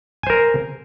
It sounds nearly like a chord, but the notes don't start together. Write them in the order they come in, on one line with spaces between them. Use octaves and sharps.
G#5 C5 A#4